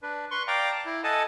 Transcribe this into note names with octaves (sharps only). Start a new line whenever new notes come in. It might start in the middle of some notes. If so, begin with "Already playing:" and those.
D4 B4
B4 C6 C#6
D5 F5 G5 A#5 D6
A5
E4
A4 D#5 F#5 G#5 A5